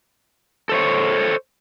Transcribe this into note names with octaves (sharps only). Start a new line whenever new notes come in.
A4 C5 C#5